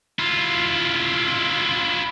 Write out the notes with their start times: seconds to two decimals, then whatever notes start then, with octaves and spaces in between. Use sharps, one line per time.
0.19 E4 F4